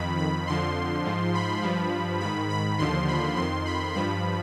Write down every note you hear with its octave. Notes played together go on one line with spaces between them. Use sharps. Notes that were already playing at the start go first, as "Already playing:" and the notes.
Already playing: F2 D#3 B5
B5
F2 D3 F3 C6
G#2 F3
B5
G2 F3
G#2 D#3 B5
B5
D#2 D3 F3 C6
B5
F2 D#3 C6
B5
G2 F3 B5